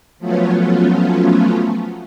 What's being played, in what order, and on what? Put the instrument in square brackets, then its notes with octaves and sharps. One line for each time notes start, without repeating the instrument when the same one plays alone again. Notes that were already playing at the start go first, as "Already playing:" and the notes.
[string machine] F3 F#3 A3 B3 C#4 F4